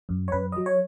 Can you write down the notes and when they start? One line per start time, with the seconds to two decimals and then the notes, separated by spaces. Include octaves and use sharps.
0.09 F#2
0.28 C#5
0.32 F#2 B4
0.52 F#3 D#5
0.66 C#5